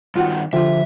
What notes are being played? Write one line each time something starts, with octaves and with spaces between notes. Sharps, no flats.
G2 D#3 F4 F#4 F#5
D3 F3 F4 G4 E5